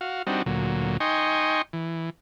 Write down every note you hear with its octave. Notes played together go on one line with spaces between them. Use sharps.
F#4 F5
G3 C4 D4 D#4 F#4
D2 A#2 F#3
D#4 D#5 G5 G#5 C6 C#6
E3